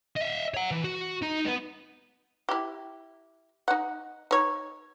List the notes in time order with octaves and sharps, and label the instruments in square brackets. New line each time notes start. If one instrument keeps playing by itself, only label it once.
[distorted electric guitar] D#5 E5
C#5 F#5
E3
F#4
D#4 D#5
B3
[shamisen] E4 G4
D#4 F#5
D#4 C#5